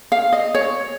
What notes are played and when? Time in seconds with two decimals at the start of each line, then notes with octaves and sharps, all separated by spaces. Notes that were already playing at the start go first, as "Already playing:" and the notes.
0.12 F5
0.33 D#5
0.54 C#5